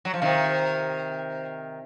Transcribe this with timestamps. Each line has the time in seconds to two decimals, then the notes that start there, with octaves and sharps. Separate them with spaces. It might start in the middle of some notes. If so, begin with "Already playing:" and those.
0.05 F#3
0.14 F3
0.22 C3 D#3